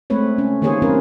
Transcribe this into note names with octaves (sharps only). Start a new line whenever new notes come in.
G#3 A3 C4 B4 C#5
C#4
D#3 A#3 G4 G#4 C5 C#5
F#3 C4 C#4 F4 A#4 B4